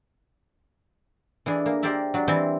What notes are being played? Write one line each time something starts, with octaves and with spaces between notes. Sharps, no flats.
E3 D4 G#4
A#3
G4 A#4 C5 D5 E5
F#3 D4
E3 G3 C4 G#5 A5 C6